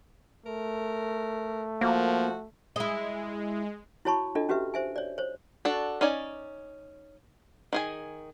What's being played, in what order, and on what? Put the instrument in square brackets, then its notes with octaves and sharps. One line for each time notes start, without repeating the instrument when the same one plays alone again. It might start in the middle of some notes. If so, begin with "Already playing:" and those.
[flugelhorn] A3 [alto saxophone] A#4
[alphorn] F3 [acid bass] A#3 [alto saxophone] F#4
[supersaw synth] G#3 [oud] E4 D#5
[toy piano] E4 F#4 C#5 A5 B5 C#6
D4 F4 A4 D#5
C#4 F#4 G4 B4 E5
C5 E5 G#5
C#5 D5
C5 C#5
[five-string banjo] D4 F#4 A4
C#4 D#4 D5 G#5
D#3 G#4 G#5